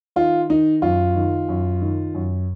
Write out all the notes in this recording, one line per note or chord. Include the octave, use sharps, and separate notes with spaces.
D#3 F4
D#3 D#4
F#2 F4
D#3
F#2
D#3
F#2